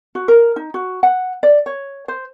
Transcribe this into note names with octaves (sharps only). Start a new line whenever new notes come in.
F#4
A#4
D#4
F#4
F#5
D5
C#5
C5